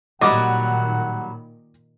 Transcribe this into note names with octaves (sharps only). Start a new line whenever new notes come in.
A#2 D#3 F#3 G3 D#5 F#5 D6